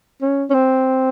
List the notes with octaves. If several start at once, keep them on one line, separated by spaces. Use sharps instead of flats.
C#4
C#4
C4